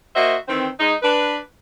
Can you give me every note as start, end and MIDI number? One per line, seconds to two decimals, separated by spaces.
0.15 0.35 58
0.15 0.35 66
0.15 0.35 72
0.15 0.35 75
0.15 0.35 76
0.48 0.68 51
0.48 0.68 52
0.48 0.68 60
0.79 0.94 56
0.79 0.94 63
1.02 1.38 62
1.02 1.38 71